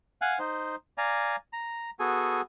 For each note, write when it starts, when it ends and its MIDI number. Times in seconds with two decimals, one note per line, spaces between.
0.22 0.38 77
0.22 0.38 78
0.22 0.38 80
0.22 0.38 90
0.39 0.76 63
0.39 0.76 72
0.98 1.36 74
0.98 1.36 77
0.98 1.36 80
0.98 1.36 82
1.53 1.90 82
2.00 2.41 59
2.00 2.41 66
2.00 2.41 68
2.00 2.41 69
2.00 2.41 80